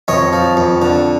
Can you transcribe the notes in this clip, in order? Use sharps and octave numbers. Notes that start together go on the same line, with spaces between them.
F2 C#5 D#5
F3
F2
D3